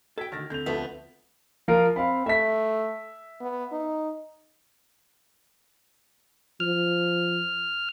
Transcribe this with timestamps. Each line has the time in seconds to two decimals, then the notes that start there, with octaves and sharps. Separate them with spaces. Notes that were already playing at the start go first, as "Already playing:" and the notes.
0.18 F#4 A4 G5 E6 G#6 B6
0.32 D2 D3 D#3 F6 A6 A#6
0.50 D3 C4 A4 G6 F7
0.66 D2 F3 A3 B3 B6
1.68 F3 F4 A#4
1.96 C4 F5 B5
2.26 A3 E5 B6
3.41 B3
3.72 D#4
6.60 F3 F6